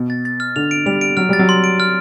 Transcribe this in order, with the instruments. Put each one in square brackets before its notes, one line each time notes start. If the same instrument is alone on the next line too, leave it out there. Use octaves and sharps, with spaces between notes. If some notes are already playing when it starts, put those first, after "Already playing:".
Already playing: [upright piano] B2
[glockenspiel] A6
A6
F6
[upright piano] D3 [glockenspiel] F7
[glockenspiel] D7
[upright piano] G3 [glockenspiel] F7
[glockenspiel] D7
[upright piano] F#3 [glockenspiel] F6
[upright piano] G3 [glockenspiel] A6
[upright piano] F#3
[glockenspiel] C6
D7
F6